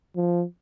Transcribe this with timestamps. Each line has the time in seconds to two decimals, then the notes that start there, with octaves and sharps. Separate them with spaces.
0.16 F3